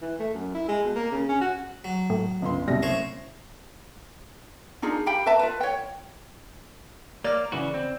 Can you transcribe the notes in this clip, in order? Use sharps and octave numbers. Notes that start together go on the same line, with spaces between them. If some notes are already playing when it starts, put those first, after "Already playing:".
E3
A3
F#2
E4
G#3
B2
A#3
C#3
C#4
F#4
F#3
A2
G1 C#2 C6
F#1 C2 B2 G3 A#6
A3 C5 C#5
D4 D#4 F4 G#4
G4 F5 G5 B5
B4 E5 A5
F4 B4
C#5 G5
A#3 D5 F6
C#3 E3 F#4
C4